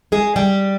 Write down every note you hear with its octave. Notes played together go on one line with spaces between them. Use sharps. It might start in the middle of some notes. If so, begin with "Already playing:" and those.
G#3 G#4
G3 G4